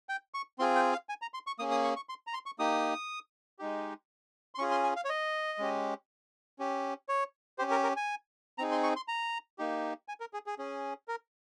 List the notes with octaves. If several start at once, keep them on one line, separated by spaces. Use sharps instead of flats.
G5
C#6
C4 F4 G#4 C6
G5
F5
G#5
A#5
C6
C#6
A#3 C#4 G#4 D#6
D#6
C#6
C#6
C6
A#5
C6
C#6
A#3 D#4 G4 D#6
G#3 D#4 G4
C6
C#4 F4 G#4 C#6
C6
G#5
F5
C#5
D#5
G#3 C#4 G4
C#4 G4
C#5
C#4 G4 C5
A#4
A#4
G#5
C4 D#4 G#4 A#5
C6
C#6
C6
A#5
A#3 D#4 G4
G#5
A#4
G#4
G#4
C#4 G#4
A#4